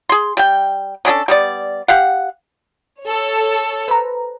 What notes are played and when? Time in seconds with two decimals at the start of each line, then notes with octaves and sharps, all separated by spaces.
0.09 G#4 C6
0.37 G3 G5
1.05 C#4 D4 G#4 A4
1.28 G3 B3 D5
1.88 G4 F5 F#5
3.04 A4 C#5
3.88 B4 C5 A#5